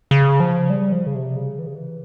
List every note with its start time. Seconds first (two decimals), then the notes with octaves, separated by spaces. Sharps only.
0.11 C#3
0.40 F3
0.70 G3
0.92 F3
1.07 C#3
1.15 C3
1.36 C#3
1.59 E3
1.67 C#3
1.75 E3